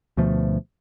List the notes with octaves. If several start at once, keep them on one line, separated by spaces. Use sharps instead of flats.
D2 B2 F3 A3